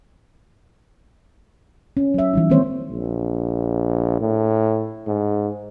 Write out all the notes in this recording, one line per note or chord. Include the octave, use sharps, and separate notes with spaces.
C#4
F#3 E5
E3 G3 D#4
D#3 G#3 A#3 C4 C5 C#5
A#1
A2
G#2